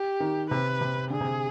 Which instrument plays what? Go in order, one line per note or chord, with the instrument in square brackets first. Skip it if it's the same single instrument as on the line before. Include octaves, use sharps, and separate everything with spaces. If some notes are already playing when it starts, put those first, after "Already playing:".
Already playing: [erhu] G4
[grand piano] D#3
[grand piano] C3 [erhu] B4
[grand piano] C3
[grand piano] D3 [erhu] G#4
[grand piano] C3